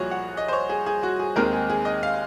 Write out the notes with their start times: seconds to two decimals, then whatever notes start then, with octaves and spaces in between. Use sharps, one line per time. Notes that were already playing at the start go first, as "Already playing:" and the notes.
Already playing: C2 A#2 F3 F#4 G#4 C#5
0.11 F#5
0.37 D#5
0.48 C5
0.53 C#5
0.69 G#4
0.86 G#4
1.03 F#4
1.19 G#4
1.36 D#2 D#3 G#3 C4 D#4 A#4
1.53 G#4
1.69 G#4
1.85 D#5
2.03 F5